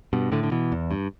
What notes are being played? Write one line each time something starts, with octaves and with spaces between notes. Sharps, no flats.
G2 B2
A2 D3
D3
B2 E3
E2
G2